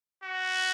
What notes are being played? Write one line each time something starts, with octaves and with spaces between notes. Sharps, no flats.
F#4